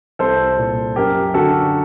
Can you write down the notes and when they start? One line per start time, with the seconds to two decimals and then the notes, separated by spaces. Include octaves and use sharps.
0.19 C2 A4 C5
0.58 A#2
0.96 F#2 G4 A#4
1.34 D3 F#4 A4